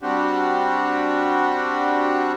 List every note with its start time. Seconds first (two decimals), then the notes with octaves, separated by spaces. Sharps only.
0.03 G3 C4 D4 F#4 G4